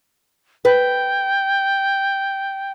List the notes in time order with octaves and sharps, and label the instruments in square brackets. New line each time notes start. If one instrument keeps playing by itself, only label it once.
[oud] B4 [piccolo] G5